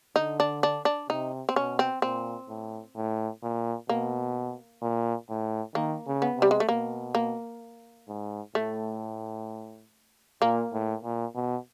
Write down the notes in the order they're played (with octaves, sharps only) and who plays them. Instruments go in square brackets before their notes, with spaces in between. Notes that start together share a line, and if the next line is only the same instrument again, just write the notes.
[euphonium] D3 [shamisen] D#4
[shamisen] D4
D4
D4
[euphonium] C3 [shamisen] D#4
[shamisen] C4
[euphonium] B2 [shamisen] C#4
[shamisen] C4
[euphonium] A#2 [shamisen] C4
[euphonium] A2
A2
A#2
[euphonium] B2 [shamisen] A#3
[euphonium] A#2
A2
[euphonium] D#3 [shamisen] A#3
[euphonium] C#3
[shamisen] B3
[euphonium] C3
[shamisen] G3
G#3
A3
[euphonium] B2 [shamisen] A#3
[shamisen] A#3
[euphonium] G#2
[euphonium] A2 [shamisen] A3
[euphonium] A#2 [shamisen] A#3
[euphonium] A2
A#2
B2